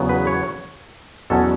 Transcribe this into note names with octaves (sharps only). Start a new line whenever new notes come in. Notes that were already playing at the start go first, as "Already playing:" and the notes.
Already playing: E2 C#3 F#3 B3
B4
C#5
E2 B2 F#3 C#4 A4